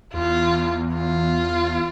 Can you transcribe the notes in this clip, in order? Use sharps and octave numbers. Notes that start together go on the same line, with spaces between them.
E2 F4
F4